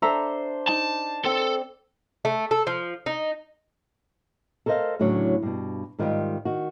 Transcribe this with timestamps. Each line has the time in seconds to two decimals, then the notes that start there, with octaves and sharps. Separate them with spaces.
0.02 D4 A4 C5 E5 A#5
0.69 D#4 A5
1.25 C4 A4
2.25 A3
2.51 A4
2.67 F3
3.06 D#4
4.66 A4 A#4 C5 C#5 D#5 F5
4.99 D2 A2 C#3 F#3 D4 C#5
5.42 G2 B2
5.99 G#2 D#3 G3 F4 G4
6.45 D#3 F#4